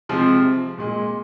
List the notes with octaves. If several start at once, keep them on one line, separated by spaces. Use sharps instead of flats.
C3 F3 G#3 C4
A#2 G#3